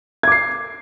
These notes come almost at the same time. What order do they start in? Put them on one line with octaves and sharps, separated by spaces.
G#6 D6 C7